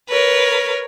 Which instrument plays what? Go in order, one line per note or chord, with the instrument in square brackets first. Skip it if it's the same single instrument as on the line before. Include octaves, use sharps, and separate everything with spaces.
[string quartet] A#4 B4 C#5